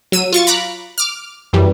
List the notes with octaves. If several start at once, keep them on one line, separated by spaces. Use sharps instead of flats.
F#3 E6 D#7
F4 C#6 A6
A#5 B5 D6 F#6
D6 F6
F#2 E3 G3